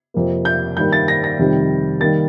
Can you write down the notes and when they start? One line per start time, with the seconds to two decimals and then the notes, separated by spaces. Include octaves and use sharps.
0.14 F2 C3 F3 A#3
0.45 G6
0.77 G2 D#3 G3 A#3 G6
0.93 A6
1.08 A#6
1.24 A#6
1.39 F2 C3 D#3 G3
2.00 D#3 G3 A#3 A6